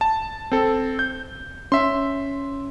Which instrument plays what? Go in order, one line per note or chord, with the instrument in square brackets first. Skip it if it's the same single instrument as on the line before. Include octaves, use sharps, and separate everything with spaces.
[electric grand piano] A5
C4 A4
G6
[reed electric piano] C#4 [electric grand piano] E5 C6